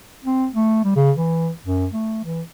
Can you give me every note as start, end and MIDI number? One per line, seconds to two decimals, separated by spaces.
0.25 0.47 60
0.54 0.80 57
0.85 0.94 55
0.96 1.12 49
1.17 1.50 52
1.66 1.87 42
1.93 2.22 57
2.24 2.42 52